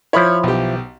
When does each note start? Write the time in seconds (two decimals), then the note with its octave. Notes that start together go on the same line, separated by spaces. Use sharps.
0.13 F3 E4 C#5 B5
0.43 B1 G4